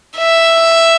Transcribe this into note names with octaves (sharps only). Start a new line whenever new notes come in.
E5